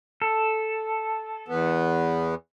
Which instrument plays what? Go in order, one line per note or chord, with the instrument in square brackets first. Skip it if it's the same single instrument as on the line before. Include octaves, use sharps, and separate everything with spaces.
[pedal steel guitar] A4
[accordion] E2 B3